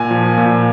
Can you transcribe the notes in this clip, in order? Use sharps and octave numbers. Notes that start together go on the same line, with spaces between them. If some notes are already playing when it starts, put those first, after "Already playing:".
Already playing: A#2 G#5
F3
A#2